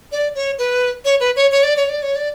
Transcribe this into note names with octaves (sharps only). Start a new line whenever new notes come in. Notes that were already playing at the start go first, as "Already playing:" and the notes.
D5
C#5
B4
C#5
B4
C#5
C#5
D5
C#5
D5
C#5
D5